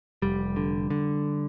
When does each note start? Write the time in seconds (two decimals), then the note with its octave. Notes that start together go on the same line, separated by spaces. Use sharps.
0.22 F1 G3
0.56 D3
0.90 D3